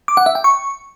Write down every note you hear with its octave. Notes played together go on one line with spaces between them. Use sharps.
D6
F#5
E5
G5
C#6